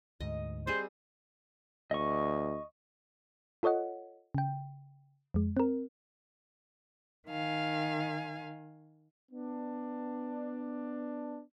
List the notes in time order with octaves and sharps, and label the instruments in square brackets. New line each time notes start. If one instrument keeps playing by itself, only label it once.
[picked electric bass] D2 G#2 [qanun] D#5
[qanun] G3 C4 G#4 [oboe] C5
[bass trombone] D2 [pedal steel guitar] D#5 C#6
[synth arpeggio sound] F4 A4 C#5 D#5 F#5
C#3 G5
F2 G#3
C4 A#4
[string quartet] D#3 F5 G#5
[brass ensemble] B3 D4